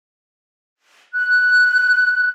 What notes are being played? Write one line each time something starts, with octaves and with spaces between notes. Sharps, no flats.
F#6